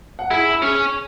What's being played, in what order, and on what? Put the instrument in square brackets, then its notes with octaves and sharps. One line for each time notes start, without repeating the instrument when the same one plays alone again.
[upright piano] F#5
[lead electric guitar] E4 [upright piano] G#4 G#5
[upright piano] B5
[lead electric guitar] C#4 [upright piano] G#4 G#5